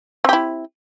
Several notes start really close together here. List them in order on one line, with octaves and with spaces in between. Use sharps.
C4 G4 E4